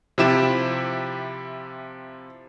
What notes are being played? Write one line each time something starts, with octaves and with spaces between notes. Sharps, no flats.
C3 F3 E4 G4 E7